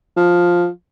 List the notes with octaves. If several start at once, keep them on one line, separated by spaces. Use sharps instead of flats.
F3